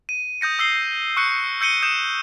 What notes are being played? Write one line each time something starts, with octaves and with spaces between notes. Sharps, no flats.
D#7
D#6 G6 A#6 C#7
D#6 E6 A#6 C7 G7
C#6 E6 F#6 C#7
E6 G6 C#7 D#7 G7
D#6 G6 C#7 E7